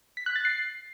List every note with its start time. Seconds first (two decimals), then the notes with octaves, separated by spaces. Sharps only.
0.17 B6
0.26 F#6
0.36 A6
0.45 C7